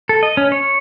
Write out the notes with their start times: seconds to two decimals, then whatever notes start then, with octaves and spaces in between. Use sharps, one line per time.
0.09 A4
0.23 D#5
0.37 C#4
0.52 C#5